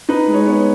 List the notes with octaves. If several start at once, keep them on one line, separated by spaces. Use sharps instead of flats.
D#4 B4
G#3
C#5
B3 C#5